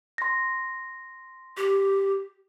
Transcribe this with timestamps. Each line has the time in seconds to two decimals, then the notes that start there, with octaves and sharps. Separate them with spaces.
0.18 C6 A#6
1.57 G4